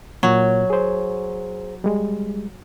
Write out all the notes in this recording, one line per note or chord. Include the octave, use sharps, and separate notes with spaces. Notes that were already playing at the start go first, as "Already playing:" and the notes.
A#2 F#3
G#4 C5
G3 G#3